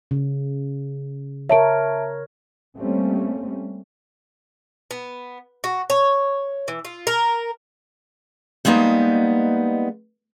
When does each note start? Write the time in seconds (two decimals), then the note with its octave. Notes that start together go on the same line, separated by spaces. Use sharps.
0.11 C#3
1.50 A#4 C#5 E5 A5 D7
2.77 G3 A3 A#3 C4 C#4
4.91 B3
5.64 F#4
5.90 C#5
6.68 E3
6.85 F4
7.07 A#4
8.65 G3 G#3 A#3 B3 D#4